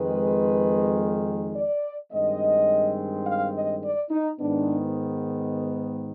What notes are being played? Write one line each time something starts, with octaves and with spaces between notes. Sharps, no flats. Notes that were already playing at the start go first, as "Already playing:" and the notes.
Already playing: F2 D#3 G#3 B4
D5
G2 D#3 G#3 C4 D#5
F5
D#5
D5
D#4
G#2 D#3 B3 D4